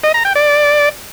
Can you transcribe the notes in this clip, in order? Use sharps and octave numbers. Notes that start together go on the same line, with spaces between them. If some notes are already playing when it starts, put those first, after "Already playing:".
D#5
A#5
G5
D5